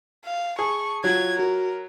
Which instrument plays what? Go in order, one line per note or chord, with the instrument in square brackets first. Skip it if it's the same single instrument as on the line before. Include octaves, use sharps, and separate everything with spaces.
[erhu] F5
[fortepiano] G#4 [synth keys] A5 [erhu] C#6
[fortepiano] F#3 [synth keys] F4 [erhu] G#6
[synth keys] F#4 [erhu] A#4